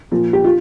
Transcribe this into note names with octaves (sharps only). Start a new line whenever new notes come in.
A#2 F3
G4
F4